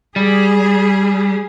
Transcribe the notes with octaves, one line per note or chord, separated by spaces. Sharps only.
G3 G#4